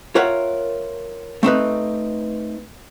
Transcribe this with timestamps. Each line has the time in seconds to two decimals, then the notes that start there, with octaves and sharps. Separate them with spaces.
0.15 F4 A#4 C#5 E5 F#5
1.43 A3 C4 D#4 B4